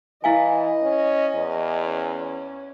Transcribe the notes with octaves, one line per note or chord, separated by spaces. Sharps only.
E3 E4 D#5 F5 G#5
C#4
E2
C#4